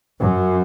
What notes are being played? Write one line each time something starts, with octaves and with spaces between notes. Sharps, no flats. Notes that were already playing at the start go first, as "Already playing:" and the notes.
F#2